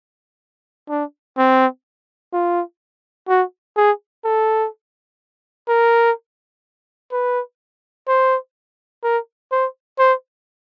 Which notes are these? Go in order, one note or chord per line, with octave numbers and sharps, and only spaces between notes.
D4
C4
F4
F#4
G#4
A4
A#4
B4
C5
A#4
C5
C5